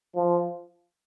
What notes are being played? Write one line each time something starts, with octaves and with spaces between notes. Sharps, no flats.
F3